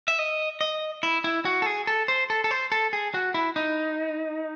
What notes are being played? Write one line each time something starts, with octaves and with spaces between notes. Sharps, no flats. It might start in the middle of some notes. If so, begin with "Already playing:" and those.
E5
D#5
D#5
E4
E4
F#4
A4
G#4
A4
C5
A4
A4
C5
A4
G#4
F#4
E4
D#4